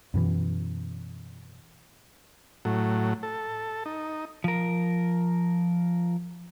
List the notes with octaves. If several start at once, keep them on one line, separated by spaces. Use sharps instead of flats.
F#2 B2 E3
A2 F#3
A4
D#4
F3 A#4